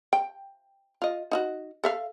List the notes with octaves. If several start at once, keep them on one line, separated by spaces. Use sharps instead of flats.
G5
F4 D#5
D#4 F4 F#4
A4 E5 F5